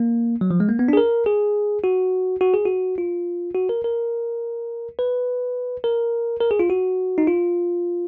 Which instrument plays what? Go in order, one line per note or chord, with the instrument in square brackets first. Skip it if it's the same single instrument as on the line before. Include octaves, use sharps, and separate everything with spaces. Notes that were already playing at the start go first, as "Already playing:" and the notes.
Already playing: [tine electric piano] A#3
F#3
F3
G#3
A#3
B3
D4
G#4
A#4
G#4
F#4
F#4
G#4
F#4
F4
F#4
A#4
A#4
B4
A#4
A#4
G#4
F4
F#4
D#4
F4